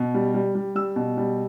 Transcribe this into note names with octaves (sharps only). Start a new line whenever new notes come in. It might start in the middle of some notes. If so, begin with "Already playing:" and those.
Already playing: B2
G3
G3
G3
G3 E6
B2
G3